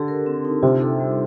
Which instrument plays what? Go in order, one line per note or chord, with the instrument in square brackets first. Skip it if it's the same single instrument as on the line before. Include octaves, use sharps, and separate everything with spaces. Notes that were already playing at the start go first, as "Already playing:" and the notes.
Already playing: [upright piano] D3 [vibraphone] G4 A4
[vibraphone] A#4
C4
D#4
[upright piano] C3 [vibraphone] F4
[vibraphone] A4
G3